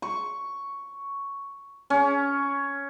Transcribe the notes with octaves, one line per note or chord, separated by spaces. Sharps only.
C#6
C#4